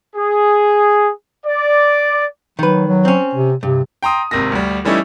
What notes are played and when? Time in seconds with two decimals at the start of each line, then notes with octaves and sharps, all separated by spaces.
0.16 G#4
1.45 D5
2.59 D#3 F#3 B4
2.87 F#3
3.05 C4 C#4
3.35 C3
3.63 G2 C3
4.03 G5 A#5 C6 D#6
4.31 G#1 C3 A#3 A#6
4.52 D2 G3
4.85 E3 G3 A3 C#4 D#4 E4